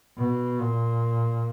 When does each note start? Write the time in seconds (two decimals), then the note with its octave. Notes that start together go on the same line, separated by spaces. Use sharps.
0.17 B2
0.60 A#2